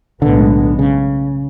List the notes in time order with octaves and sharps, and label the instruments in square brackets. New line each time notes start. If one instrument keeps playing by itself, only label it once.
[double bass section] B1 A2 G#3 B3 [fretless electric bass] D3
[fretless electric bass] C#3